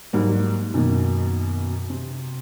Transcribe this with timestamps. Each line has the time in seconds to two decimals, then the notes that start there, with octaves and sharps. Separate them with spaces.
0.13 G#2 F#3 G3 A#3
0.74 F#2 B2 D#3 A#3
1.90 C3